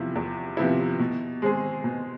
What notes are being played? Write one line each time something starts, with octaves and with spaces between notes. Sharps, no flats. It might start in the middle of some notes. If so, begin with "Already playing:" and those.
Already playing: E2 C3 F3 B3 E4
E2
C3 F3 B3 E4
B2
G#3 C4 G#4
B2